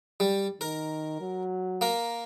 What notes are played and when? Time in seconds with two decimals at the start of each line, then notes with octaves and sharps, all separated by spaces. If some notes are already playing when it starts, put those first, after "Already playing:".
0.20 G3
0.61 D#3 A#4
1.21 F#3
1.81 A#3 A#4